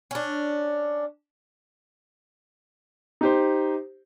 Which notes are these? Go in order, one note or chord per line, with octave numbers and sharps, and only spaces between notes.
C#4 D4
D#4 G4 C5